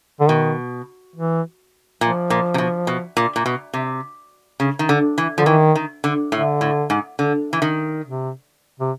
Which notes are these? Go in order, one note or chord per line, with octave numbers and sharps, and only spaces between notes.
D3
B2 D#3
E3
A#2 F3
A#2
C3
B2
B2
A#2
A#2
B2
C3
C#3
D#3
D3
E3
D3 F3
D#3 E3
D#3
D3
A2 D3
A2
G#2
D3
E3
D#3
C3
C3